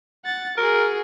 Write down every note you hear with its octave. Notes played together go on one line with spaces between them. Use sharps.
F#5 A6
F#4 G#4 A#4